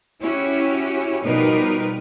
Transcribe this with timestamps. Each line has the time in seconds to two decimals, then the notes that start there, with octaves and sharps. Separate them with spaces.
0.22 C#4 E4 F#4 G4
1.23 B2 F3 G3 D#4 A#4 B4